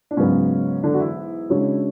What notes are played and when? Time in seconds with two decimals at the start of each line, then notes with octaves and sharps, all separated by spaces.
0.11 D4
0.17 G#2 C#3 F#3 B3 C#4
0.83 D3 D4
0.94 F#4
1.00 E3 E4
1.50 C#3 G#3 D4 F#4 C#5